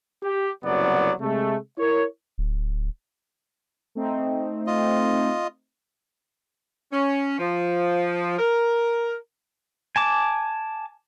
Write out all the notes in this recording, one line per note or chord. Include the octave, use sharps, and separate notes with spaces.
G4
F#1 C2 F#3 B3 D5
C3 G#3 A3
E4 A#4 C#5
D1
A3 C4 D#4
F4 D#5
C#4
F3
A#4
G#5 A5 D6